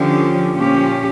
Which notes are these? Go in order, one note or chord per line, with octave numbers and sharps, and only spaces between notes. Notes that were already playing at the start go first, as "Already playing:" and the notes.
Already playing: D3 F3 C#4 G4
A#2 F3 C#4 G4